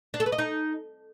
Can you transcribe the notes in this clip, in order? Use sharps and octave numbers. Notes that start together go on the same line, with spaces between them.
D4
A4
B4
D#5
D#4